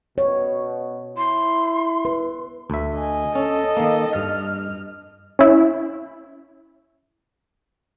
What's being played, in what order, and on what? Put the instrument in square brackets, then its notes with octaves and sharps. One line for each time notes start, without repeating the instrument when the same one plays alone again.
[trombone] B2 [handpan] C#5
[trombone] E4 [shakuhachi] C6
[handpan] B4
[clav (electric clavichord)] D2 E5
[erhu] D#5 [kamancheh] G#5
[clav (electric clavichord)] C#4 [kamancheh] A4
[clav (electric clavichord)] D#3 A#3
[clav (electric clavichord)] G2 [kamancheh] F6
[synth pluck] C#4 E4